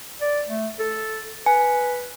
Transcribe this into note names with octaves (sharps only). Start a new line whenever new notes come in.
D5
A3
A4
B4 G#5